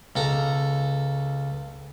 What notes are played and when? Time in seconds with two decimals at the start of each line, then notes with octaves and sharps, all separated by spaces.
0.16 C#2 A4 A#5